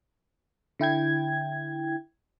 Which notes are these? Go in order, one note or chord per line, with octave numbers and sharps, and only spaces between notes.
D3 E4 G5 G#6